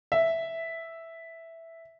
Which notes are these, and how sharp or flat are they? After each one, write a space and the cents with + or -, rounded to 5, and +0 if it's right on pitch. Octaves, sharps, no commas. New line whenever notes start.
E5 +0